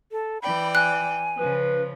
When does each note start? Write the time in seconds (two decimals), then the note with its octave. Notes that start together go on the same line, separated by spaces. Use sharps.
0.12 A4
0.42 E3 D5 G5 B5
0.75 G#5 F#6
1.38 C#3 F3 B4